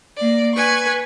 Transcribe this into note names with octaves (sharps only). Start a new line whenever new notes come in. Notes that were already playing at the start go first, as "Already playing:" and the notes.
A#3 D5
B4 G#5 C#6